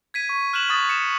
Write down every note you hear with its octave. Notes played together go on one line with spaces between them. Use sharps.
G#6 B6 D#7
C#6
F6 F#6 B6 E7 F#7
C#6 D#6 A6
C#7 E7